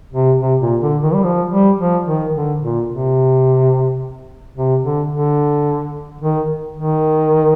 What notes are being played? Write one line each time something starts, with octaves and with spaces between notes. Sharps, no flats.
C3
C3
A#2
D3
D#3
G3
F3
G3
F3
D#3
D3
A#2
C3
C3
D3
D3
D#3
D#3